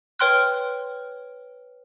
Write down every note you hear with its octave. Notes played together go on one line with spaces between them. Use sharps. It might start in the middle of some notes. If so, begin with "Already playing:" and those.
B4 C#5 G5 C6 F6 F#6